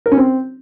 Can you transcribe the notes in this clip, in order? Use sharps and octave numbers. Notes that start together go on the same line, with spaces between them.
A#4
C#4
C4